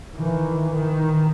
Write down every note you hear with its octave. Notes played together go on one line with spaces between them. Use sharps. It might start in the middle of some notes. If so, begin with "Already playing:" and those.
D#3 E3
D#3